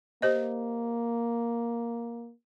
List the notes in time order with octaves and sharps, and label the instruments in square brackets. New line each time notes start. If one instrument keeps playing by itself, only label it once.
[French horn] A#3 [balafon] G4 C5 D#5